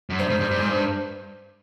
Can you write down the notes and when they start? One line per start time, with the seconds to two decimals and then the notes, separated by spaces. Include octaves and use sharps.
0.10 F#2
0.19 G2 C5
0.30 G#2
0.40 G2
0.51 G2
0.59 G#2
0.68 G2